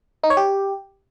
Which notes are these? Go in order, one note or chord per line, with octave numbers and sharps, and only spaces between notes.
D#4
C#5
G4